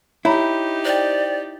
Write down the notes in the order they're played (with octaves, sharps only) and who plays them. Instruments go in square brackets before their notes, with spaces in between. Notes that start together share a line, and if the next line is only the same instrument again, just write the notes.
[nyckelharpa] D#4 G4 [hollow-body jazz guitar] E4 [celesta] C#5 A#5 B5
[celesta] C5 G5 [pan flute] D5